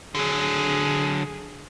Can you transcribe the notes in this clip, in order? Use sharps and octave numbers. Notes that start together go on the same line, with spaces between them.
D3 F#3 G#4